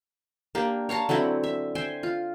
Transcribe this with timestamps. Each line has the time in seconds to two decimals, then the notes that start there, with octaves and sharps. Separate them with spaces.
0.55 A#3 D4 G4
0.89 C#5 F5 A5 A#5
1.09 D3 F#3 C4 E4
1.44 E5
1.75 C5 E5 G5 G#5
2.03 F4